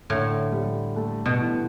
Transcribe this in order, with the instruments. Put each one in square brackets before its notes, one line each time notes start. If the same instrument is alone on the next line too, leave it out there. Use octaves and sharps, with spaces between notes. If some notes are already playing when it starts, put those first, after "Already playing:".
[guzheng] A2 [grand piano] D3
[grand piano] G3
A3
[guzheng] B2
[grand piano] E3